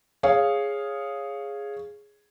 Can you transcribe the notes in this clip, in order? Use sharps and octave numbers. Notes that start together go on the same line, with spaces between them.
G#4 C#5 F5